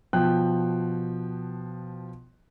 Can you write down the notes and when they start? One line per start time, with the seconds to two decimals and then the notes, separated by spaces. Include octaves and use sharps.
0.13 B2 F3 G5 F#6